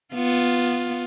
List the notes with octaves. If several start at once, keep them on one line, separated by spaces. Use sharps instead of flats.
B3 F4